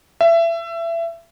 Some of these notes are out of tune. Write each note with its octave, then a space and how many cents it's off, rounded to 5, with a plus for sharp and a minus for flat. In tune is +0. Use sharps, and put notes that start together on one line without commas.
E5 +25